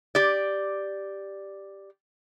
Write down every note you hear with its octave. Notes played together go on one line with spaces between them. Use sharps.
G4 D5